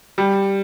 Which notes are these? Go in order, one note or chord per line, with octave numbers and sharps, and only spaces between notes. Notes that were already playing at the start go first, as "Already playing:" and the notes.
G3